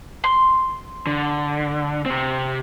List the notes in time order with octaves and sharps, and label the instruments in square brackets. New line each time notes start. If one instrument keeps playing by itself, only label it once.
[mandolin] C6
[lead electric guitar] D3
C3 C4